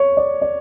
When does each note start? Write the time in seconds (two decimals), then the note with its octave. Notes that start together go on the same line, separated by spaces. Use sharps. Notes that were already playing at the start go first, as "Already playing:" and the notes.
Already playing: C#5
0.17 D5
0.42 D5